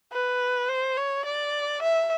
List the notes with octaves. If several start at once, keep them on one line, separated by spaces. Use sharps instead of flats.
B4
C5
C#5
D5
E5